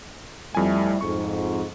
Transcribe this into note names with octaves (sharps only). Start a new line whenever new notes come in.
F2 G3 A3 E4 G#5
F2 G#2 C#6